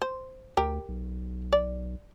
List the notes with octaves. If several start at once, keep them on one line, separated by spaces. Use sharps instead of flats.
C5
D2 G4 A#4
B1
D5